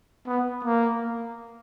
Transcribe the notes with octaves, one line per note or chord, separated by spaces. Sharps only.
B3
A#3